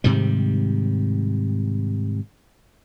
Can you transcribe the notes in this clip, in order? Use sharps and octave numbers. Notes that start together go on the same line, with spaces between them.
G#2 C3 D#3 G3